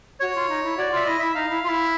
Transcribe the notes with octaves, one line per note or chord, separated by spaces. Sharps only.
F#4 C#5
F4
D#4
E4
F#4 D5
F4 E5
E4 D#5
E4 E5
D#4 F5
E4
F4
E4